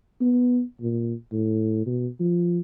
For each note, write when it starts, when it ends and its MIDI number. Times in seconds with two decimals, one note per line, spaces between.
0.21 0.62 59
0.81 1.14 46
1.32 1.85 45
1.87 2.07 47
2.20 2.60 53